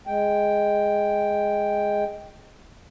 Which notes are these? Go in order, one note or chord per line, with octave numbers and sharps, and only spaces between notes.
G#3 G5